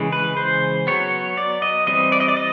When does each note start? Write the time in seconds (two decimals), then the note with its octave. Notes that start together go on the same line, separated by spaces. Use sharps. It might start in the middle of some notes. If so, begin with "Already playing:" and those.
Already playing: C#3 E3 G#3
0.12 B4
0.37 C5
0.87 F#3 B3 C#5
1.37 D5
1.62 D#5
1.87 E3 G3 C4 D#5
2.12 D5
2.20 D#5
2.28 D5
2.37 D#5